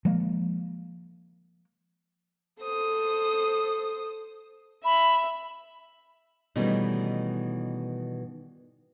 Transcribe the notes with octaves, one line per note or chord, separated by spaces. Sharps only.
F3 G#3 A#3
A4 C5 D#6
E5 B5
B2 D#3 E3 G3 A3 C#4